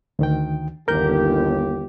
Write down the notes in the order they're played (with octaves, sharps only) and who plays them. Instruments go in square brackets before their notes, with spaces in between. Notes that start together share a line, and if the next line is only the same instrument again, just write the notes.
[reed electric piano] D2 D#3 G5
[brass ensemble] G1 D#2 G4 [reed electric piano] A#4 G6